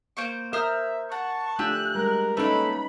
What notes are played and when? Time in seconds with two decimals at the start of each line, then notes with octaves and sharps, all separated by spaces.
0.17 A#3 C5 C#6
0.53 A#4 C5 E5 D#6 F6
1.12 F#5 A5 C#6
1.59 A3 D4 F4 G4 G#5 E6 F#6
1.95 G3 G#3 A#4
2.37 A3 A#3 C#4 D#4 A4 B4 B5